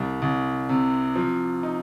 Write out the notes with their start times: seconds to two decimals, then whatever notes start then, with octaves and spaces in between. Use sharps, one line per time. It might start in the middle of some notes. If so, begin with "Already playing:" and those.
Already playing: C2 G3
0.22 C2
0.69 C3
1.16 F3
1.63 D#4